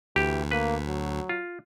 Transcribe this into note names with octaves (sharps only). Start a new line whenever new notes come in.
D2 E3 G4
A#3 B4
F#3
F4